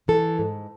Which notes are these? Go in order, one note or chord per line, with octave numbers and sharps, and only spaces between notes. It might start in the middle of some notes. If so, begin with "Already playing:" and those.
E3 A4
G#2